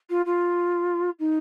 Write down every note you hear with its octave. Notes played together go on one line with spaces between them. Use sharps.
F4
F4
D#4